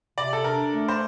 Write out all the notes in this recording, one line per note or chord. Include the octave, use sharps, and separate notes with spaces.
C3 D5
A4
D4 A#4
A3
C5